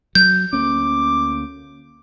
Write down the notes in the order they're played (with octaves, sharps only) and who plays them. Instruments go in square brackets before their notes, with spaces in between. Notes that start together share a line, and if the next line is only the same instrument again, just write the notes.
[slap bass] F#3 [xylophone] G6
[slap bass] D2 A#3 C#4 [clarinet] D6